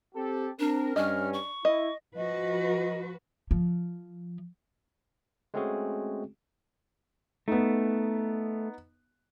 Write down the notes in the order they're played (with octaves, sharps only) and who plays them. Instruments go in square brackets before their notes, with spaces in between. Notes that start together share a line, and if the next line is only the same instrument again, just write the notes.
[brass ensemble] C4 G4 A4
[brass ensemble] C4 A#4 [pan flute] D4
[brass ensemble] G2 C#4 [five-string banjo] D4 D#5 [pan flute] F6
[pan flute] C#6
[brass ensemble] E4 [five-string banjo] D#5
[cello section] F3 F#4 B4 [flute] D#5
[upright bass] F3
[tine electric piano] G#3 A3 C4 C#4 F#4 G#4
[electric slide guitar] A3 [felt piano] B3 D#4